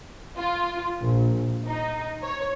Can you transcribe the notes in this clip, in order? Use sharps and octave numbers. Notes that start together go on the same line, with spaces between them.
F4
A#1
D#4
C#5